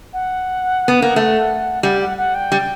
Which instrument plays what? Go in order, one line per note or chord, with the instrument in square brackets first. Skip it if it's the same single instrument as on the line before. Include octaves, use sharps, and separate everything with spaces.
[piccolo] F#5
[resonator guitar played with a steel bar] B3
A#3
A3
[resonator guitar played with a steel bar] G3 [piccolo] F#5
[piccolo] F#5
F#5
G5
[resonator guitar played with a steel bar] G3